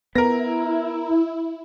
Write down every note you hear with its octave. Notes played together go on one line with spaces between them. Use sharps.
B3 E4 A#4 A#6